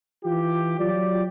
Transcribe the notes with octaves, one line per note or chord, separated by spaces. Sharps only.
E3 F4 G4
F#3 F4 G4 D5